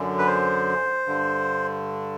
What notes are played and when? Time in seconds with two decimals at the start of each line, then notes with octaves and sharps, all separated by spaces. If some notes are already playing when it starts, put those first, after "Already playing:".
Already playing: F#2 D3
0.19 B4
0.27 C5
1.06 G2 D3